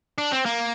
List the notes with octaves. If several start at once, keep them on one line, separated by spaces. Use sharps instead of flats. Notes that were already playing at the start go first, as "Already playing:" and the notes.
D4
C4
A#3